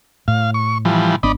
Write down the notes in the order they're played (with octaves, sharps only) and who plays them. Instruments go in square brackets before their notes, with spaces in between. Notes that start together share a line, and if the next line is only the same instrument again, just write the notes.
[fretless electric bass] A2 [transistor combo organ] F5
[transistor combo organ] C#6
E3 F3 G3
[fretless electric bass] G#1 B3 D4 [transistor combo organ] D5 D#5 B5